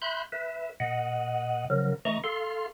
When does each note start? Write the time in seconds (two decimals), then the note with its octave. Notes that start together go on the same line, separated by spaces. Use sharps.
0.02 E5 B5 C6 F#6 G6
0.32 B4 E5
0.80 A#2 D#5 F#5
1.70 C#3 F3 F#3 A#4
2.05 E3 A3 D#5 A#5 C#6
2.24 A4 F5 C6